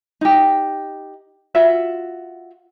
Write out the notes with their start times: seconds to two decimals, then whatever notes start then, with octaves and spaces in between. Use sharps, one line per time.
0.21 D#4 G4
1.55 F4 F#4 E5